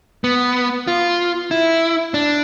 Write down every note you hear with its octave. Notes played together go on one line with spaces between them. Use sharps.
B3
F4
E4
D4